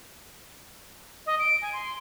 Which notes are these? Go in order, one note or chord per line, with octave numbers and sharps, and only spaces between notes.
D#5
D7
G#5
C6